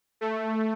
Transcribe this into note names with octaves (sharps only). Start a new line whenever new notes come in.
A3